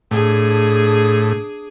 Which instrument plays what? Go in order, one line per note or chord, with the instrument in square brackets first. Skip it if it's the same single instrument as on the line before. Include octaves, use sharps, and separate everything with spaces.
[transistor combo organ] A2 [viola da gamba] D4 G#4